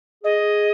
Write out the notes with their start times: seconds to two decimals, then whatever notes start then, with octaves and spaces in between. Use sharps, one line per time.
0.23 G#4 D#5